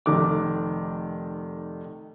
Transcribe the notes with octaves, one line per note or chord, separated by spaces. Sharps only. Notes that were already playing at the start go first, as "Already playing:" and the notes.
F1 D#3 D6